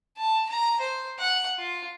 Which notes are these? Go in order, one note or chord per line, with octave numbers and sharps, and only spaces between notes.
A5
A#5
C5
F#5
F4